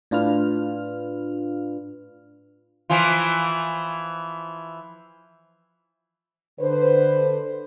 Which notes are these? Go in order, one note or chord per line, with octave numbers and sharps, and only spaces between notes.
A2 D4 F4 B4 F6
E3 F3 F4
D3 B4 C5